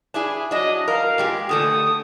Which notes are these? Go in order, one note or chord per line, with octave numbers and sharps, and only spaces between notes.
D4 E4 G#4
F#3 D4 D#5
A#4 F5
A#2 G#3 G4
D3 A3 A4 D#6